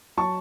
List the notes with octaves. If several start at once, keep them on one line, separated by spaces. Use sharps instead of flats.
F#3 A5 C#6